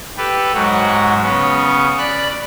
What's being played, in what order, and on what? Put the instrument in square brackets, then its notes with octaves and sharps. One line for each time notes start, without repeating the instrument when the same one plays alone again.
[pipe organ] G4 A4 B4
G#2 F#3 F#4
C#3 B3 C#4
D5 B5 F#6